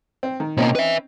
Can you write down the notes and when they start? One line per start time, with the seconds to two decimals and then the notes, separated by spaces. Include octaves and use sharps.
0.23 C4
0.40 D#3
0.57 B2 A#3 C4 C#4 D#4
0.75 B4 E5